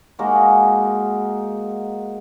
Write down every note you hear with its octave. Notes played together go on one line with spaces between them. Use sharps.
G#3 A#3 D#4 F#4